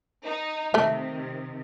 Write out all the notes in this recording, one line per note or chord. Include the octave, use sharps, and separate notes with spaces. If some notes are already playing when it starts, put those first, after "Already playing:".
D#4
C3 D#3 A3 E5